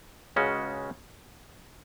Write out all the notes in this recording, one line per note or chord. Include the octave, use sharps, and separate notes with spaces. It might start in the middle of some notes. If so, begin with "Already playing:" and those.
C#2 C#3 G#3 C#4 F#4